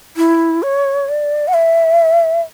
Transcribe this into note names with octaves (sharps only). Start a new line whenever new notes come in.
E4
C#5
D5
F#5
E5